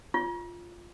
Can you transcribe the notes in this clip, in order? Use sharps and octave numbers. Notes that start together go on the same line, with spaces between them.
F4